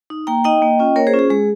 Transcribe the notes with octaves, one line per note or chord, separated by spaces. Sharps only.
D#4
A#3 G5 A#5
D#4 D#5 G5
A#3
C#4 F4
A#3 A#4 C#5
G#4 C5
C#4 F4
G#4
G#3 G#4